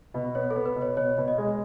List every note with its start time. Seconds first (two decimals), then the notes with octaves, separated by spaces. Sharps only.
0.14 B2
0.35 B3 C#5
0.51 A4
0.56 B3
0.66 B4
0.76 B2
0.81 C#5
0.97 B2 C#5
1.18 B2
1.28 D#5
1.38 G#3